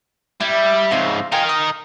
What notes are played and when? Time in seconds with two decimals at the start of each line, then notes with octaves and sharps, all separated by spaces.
0.40 G3 E4
0.91 G#2 C#3 C4 D#4 F4
1.32 D#4 F4 A#4 G5 G#5
1.49 D#6